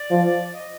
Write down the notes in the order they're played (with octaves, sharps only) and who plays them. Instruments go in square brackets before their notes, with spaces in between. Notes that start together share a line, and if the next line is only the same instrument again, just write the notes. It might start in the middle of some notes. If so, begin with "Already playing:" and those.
Already playing: [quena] D5
[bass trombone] F3
[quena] D#5